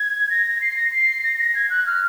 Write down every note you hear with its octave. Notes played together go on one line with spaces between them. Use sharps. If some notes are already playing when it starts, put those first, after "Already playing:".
Already playing: G#6
A#6
C7
A#6
C7
A#6
A#6
G#6
F#6
F6